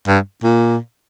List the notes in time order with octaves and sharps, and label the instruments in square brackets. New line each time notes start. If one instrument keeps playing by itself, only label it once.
[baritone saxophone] G2
A#2